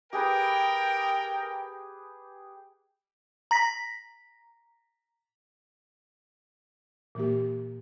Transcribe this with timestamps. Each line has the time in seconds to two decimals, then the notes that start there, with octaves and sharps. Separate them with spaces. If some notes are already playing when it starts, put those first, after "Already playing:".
0.13 G4 G#4 A#4 B4 G5
3.51 A#5 A#6 B6
7.15 A#2 E3 A#3 G4